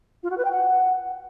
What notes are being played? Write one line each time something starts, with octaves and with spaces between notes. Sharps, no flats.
F4
F#4
B4
G5
F#5